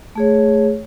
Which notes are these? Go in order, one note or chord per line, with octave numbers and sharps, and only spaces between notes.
A3 G#4 C#5